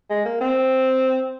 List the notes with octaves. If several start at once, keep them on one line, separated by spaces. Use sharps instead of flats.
G#3
A#3
C4